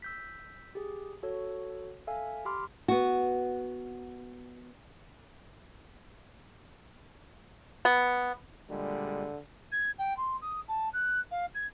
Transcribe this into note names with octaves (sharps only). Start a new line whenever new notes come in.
E6 G6 B6
G4 G#4
F#4 A4 C#5
A4 E5 F5 G#5
G4 B5 C6 D6 F6
B3 F#4
B3
A#2 D3 G3 G#3
G#6
G5
C6
D#6
A5
F#6
F5
G#6